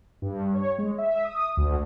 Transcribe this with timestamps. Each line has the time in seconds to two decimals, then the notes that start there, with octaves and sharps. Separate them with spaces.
0.22 G2
0.55 C#5
0.78 G#3
0.98 E5
1.24 D#6
1.57 D2